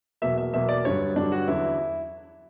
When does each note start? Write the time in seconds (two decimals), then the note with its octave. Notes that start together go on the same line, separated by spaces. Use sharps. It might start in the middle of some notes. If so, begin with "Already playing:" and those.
0.22 E2 B2 F#3 A#3 E5
0.38 E5
0.53 E2 B2 F#3 A#3 E5
0.69 D5
0.85 G2 D3 F#3 C#5
1.16 G2 D3 F#3 D4
1.32 F#4
1.47 E2 D3 F#3 E4